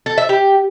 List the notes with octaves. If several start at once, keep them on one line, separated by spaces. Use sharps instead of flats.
A4
E5
G4